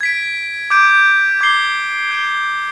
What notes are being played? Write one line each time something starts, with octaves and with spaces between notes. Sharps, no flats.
G#6 B6 D7
D6 G6 D7
D6 G#6 C7 G7
G6 D7 G7